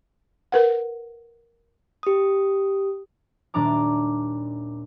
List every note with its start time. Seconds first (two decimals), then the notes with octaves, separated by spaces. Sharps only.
0.52 A#4 B4 F#5
2.03 G4 D#6
3.54 D#1 D4 A#5 D6